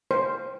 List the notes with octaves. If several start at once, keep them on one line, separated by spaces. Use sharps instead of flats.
C5